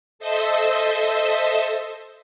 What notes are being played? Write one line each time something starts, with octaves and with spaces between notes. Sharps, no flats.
A4 C5 D#5 E5